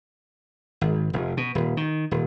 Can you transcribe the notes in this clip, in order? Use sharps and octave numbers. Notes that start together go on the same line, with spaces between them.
G#1
F1
B2
D#1
D#3
D#1